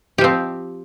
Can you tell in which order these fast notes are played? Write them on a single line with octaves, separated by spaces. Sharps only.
G4 F3 C4